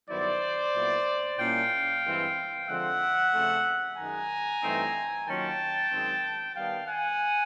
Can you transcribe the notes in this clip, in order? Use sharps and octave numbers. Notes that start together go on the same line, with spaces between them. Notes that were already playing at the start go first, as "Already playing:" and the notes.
G2 D#3 F#3 B3 E4 C5 D5
A#2 F#3 B3 E4
A#2 G3 A#3 C#4 E4 F5 G5
G2 E3 G#3 C4 E4
D3 F3 G#3 C4 F4 E5 F#5
C#3 F3 A3 C4
F#2 D#3 G#3 G#5 A#5
G2 E3 A3 C4 D#4
D#3 F#3 A#3 C#4 F4 G5 A5
F#2 D#3 G#3 C4
D#3 G3 B3 F5 G5
F#5 G#5